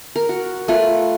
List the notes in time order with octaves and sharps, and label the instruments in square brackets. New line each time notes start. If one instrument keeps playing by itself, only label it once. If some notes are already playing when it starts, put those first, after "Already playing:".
[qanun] A#4
F#4
A3 F4 B4